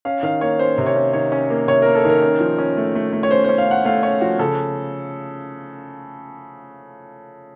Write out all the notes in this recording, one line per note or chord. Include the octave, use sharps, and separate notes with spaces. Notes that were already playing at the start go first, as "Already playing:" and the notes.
C#4 F5
D#3 F5
A#3 C#5
C#4 C5
C3
C#5
C#4
D#3 C#5
C#4
A#3
C3 C#5
A#3 A#4
A4
D#3 A#4
C#4
F3
C#4
A3
A3
A3
C#5
C#4 C5
C#4 C5
F5
C#4 F#5
A3 F5
C#4 C#5
F3 F#4
C#3 A4